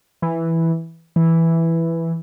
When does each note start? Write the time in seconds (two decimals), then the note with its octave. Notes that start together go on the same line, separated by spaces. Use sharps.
0.22 E3
1.16 E3